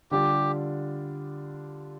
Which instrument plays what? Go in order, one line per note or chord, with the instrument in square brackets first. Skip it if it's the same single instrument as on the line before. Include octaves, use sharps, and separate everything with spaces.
[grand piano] D3 G3 D4 F4 [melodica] G4